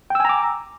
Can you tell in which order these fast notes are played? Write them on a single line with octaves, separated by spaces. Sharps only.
G5 E6 G#5 A#5 D6